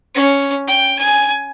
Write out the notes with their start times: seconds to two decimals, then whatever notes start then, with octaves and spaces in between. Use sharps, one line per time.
0.15 C#4
0.68 G5
0.99 G#5